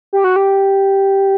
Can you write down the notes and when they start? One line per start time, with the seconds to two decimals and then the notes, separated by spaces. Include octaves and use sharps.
0.13 G4
0.24 F#4
0.36 G4